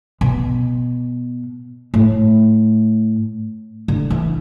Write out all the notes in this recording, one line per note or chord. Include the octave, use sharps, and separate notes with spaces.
B2
A2
D3
E3